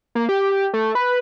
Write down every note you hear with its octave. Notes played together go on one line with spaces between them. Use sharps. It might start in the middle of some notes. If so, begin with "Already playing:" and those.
A#3
G4
A3
B4